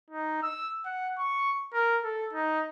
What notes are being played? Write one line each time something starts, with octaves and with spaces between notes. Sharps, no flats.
D#4
E6
F#5
C#6
A#4
A4
D#4